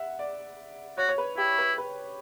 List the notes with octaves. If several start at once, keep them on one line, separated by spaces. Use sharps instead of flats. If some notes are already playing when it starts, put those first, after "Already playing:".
Already playing: E5 F#5
D5
F#4 C#5
C#5
B4
E4 G4
B4
B4